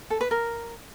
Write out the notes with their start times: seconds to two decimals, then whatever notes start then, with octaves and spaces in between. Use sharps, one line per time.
0.10 A4
0.21 B4
0.31 A#4